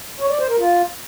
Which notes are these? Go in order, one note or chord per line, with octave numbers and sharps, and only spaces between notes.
C#5
D5
C5
A#4
F4